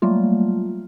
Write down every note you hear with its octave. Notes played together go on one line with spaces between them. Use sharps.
F#3 G3 A3 A#3 F4